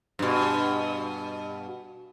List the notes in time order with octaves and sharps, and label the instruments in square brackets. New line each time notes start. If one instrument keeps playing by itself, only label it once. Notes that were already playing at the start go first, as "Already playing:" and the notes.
[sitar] G2 B2